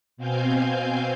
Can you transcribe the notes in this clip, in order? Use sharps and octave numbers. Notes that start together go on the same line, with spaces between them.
B2 C4 F5 G#5 G6